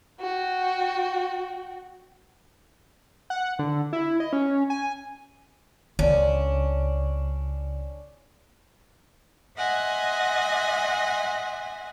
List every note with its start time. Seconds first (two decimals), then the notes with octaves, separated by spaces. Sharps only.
0.21 F#4 G5
3.30 F#5
3.59 D3
3.93 E4
4.20 D#5
4.33 C#4
4.70 G#5
5.99 C#2 C#4 D4
9.56 D#5 E5 F#5 G#5 C6